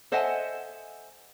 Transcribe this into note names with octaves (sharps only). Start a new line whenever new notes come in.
A4 C5 D#5 E5 F#5 G#5